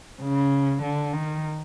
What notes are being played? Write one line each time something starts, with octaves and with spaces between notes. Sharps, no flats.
C#3
D3
D#3